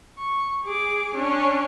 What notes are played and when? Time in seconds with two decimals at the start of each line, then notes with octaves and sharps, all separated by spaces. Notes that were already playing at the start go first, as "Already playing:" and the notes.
0.18 C#6
0.64 G#4 D6
1.15 C#4 D4